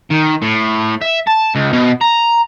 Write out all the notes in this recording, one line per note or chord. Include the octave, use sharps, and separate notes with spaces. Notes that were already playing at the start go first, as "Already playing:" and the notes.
D#3
A2
E5
A5
C#2
B2
A#5